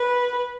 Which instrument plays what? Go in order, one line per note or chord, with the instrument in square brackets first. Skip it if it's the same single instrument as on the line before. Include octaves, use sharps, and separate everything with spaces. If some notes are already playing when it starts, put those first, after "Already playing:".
Already playing: [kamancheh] B4